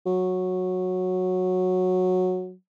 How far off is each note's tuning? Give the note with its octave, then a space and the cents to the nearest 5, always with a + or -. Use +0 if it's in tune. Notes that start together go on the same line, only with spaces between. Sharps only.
F#3 -10